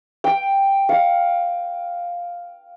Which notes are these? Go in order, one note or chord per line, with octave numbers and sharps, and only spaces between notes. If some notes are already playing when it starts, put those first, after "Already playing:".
G5
F5